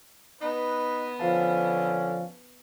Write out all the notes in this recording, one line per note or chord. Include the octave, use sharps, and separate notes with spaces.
B3 D#4 B4
D3 F3 C#4 F5 A5